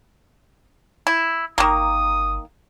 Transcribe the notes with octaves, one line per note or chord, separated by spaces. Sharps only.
E4
G1 D#3 A#3 D#6